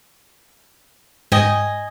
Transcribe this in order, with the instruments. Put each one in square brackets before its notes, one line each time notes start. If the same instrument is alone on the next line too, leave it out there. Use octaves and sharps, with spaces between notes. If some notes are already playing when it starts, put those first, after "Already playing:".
[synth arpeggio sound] G#2 G5 G6 [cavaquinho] D#5 G#5